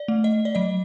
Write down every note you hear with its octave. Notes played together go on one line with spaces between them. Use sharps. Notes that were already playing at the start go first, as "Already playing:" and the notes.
Already playing: D5
A3
D#5
D5
F#3 D#5